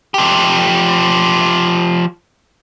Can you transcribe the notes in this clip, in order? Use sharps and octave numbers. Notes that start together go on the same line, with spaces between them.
F3 G4